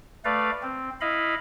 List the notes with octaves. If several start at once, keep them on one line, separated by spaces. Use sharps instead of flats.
A3 B4 D5 F5
C4
E4 D#5 F5 B5